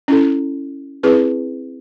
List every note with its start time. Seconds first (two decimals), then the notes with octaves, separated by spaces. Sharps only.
0.08 C#4 E4 A4
1.03 C4 E4 G#4 B4